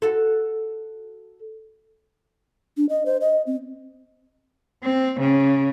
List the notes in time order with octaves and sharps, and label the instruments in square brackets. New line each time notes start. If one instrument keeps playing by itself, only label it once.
[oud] F#4 A4
[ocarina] D4
D#5
C5
D#5
C4
[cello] C4
C#3